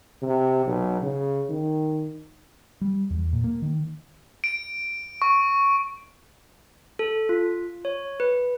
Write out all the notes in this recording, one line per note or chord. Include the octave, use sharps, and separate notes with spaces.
C3
B1
C#3
D#3
G3
E2
A#2
A#3
D#3
D7
C#6
A4
F4
C#5
B4